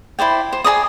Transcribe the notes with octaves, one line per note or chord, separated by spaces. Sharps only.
E4 C5 D5 G5
C5
G#4 A#4 D5 D#6